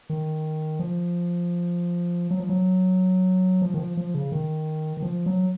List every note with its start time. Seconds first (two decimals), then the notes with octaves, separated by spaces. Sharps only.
0.10 D#3
0.80 F3
2.30 F#3
2.40 F3
2.49 F#3
3.62 F3
3.74 D#3
3.79 F3
3.97 F3
4.14 C#3
4.32 D#3
4.97 D#3
5.02 F3
5.26 F#3